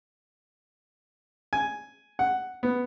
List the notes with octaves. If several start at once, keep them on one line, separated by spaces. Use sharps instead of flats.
G#5
F#5
B3